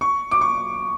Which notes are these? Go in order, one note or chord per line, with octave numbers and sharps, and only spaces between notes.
C#6
D6
C#6